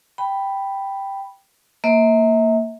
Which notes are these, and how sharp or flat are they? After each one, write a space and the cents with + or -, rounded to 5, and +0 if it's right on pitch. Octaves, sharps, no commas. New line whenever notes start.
G5 +0 B5 +0
A#3 -20 C5 +0 E5 -35